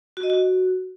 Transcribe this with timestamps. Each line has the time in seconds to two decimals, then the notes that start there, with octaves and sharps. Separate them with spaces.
0.17 F#4
0.23 D#5
0.30 F#4